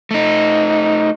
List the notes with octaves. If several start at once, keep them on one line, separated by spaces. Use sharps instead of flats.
A3 D#4